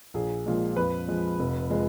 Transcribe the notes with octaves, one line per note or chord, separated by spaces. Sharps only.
A#1 G#4
A#2 F3 G#3
F2 B4
F3 G#3
F1
F3 G#3